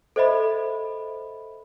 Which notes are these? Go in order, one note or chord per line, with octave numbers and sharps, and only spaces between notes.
A4 C5 D#5 E5 B5